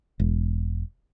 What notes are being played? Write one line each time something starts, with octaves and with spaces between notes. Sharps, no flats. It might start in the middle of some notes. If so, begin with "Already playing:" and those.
E1